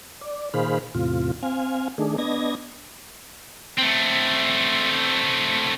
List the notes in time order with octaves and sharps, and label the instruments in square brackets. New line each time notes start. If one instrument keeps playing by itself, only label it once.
[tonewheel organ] D5
A#2 D#3 G#4 C5 F5 B5
E2 A2 C3 F4
C4 F5 G#5
D#3 A3 D4 G#4
B3 D4 D#5 G#6 A#6
[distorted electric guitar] A3 C4